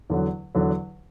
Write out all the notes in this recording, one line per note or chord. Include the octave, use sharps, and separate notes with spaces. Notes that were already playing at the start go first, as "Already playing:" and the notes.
E2 D3 F#3
E2 D3 F#3